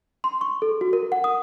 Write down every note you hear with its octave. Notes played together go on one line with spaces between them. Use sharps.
C6
C#6
A4
F#4
A#4
F#5
D#6